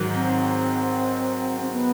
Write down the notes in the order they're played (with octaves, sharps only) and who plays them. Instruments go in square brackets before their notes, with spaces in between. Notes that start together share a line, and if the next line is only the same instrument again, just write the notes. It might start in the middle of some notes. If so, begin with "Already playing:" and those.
Already playing: [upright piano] G#2 D#3 F#3
[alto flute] C4
C4
B3